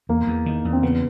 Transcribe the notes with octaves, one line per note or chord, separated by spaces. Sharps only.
E2 A#3
E2
D#3
E2
C4
C#3 B3